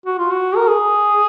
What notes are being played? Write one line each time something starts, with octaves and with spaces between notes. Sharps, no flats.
F#4
F4
F#4
A#4
G#4